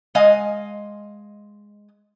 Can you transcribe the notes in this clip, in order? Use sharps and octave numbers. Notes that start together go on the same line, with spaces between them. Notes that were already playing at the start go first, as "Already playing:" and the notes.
G#3 D#5 F5 G#5